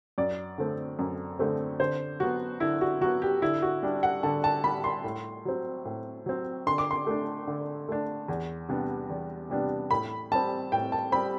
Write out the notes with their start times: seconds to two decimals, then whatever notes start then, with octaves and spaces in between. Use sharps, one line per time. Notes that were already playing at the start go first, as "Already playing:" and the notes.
0.18 F#2 D5
0.58 D3 A3 C4
0.99 F#2
1.39 D3 A3 C4
1.80 D3 C5
2.20 F#3 B3 F#4
2.60 D3 E4
2.81 F#4
3.01 F#3 B3 F#4
3.22 G4
3.42 D3 E4
3.62 F#4
3.83 G3 D4
4.03 F#5
4.23 D3 A5
4.44 A5
4.64 G3 D4 B5
4.84 C6
5.04 A2
5.45 F#3 C4
5.85 A2
6.26 F#3 C4
6.67 D3 C6
6.78 D6
6.91 C6
7.07 A3 D4
7.47 D3
7.88 A3 D4
8.28 E2
8.69 C3 G3 B3 D4
9.10 E2
9.50 C3 G3 B3 D4
9.91 A2 B5
10.31 G3 C4 A5
10.72 A2 G5
10.92 A5
11.12 G3 C4 B5